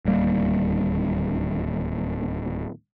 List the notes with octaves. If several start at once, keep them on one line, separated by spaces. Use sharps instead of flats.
D1 D#2 G3 A#3